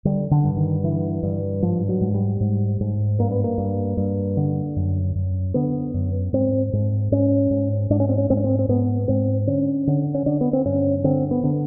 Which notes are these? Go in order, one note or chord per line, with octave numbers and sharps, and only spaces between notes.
D3 G3
D3
G2
D#3
D3 E3
G2
G#2 F3
F#3
G#2
G3
G#2
G#2
G2 A#3
B3
A#3
G2
G2
D3
F#2
F#2
D3 B3
F#2
G#2 C4
G#2
G#2 C#4
G#2
G#2 D4
C#4
C4
C#4
G#2 C4
C#4
C4
C4
G#2 B3
G#2 C4
D3 C#4
D3
C#4
D3 D4
B3
C4
G2 C#4
D3 C4
B3
D3